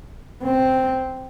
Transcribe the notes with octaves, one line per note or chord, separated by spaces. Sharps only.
C4